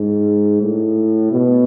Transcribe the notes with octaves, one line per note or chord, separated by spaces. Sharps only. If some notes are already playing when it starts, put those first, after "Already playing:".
Already playing: G#2
A2
B2